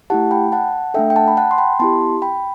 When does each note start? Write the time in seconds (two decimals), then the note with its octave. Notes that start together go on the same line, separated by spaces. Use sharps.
0.10 A3 E4 G4 F#5 A5
0.31 G5 B5
0.52 F#5 A5
0.94 A3 D4 A4 E5 G5
1.10 G5
1.16 F#5 A5
1.28 B5
1.37 F#5 A5
1.51 C6
1.58 G5 B5
1.79 B3 E4 G4 A5 C6
2.22 G5 B5